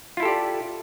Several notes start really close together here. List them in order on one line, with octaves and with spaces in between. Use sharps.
F4 E4 A4 G4 D5